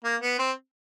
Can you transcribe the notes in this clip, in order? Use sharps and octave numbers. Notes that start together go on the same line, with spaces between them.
A#3
B3
C4